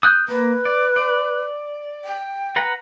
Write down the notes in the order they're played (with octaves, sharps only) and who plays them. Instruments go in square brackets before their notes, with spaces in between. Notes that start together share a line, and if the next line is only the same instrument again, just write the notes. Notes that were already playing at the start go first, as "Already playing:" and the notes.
[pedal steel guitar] D#6 F#6 G6
[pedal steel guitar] A#3 [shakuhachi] B4
[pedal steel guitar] D5
D5
[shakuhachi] G5
[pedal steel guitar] B4 F#5 A#5